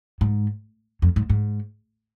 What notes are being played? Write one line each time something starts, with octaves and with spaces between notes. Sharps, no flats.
G#2
F2
G#2
G#2